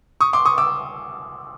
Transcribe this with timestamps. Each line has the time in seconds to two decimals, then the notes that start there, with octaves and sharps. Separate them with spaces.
0.21 C#6 D#6
0.33 C6 D6
0.45 C#6 D#6
0.58 D6 E6